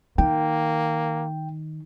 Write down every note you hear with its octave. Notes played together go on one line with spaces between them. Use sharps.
D#3 A#3 G5